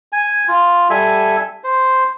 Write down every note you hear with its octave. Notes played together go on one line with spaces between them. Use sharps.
G#5
F4
G3 A4 E5 G#5
C5